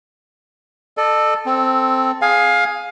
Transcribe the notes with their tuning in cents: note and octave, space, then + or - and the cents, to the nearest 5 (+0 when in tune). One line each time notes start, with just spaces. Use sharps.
A4 +0 D#5 -45
C4 +0 A4 +0
G#4 +0 F5 +20 G#5 +0